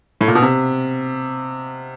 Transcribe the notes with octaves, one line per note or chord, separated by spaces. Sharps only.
A2
A#2
B2
C3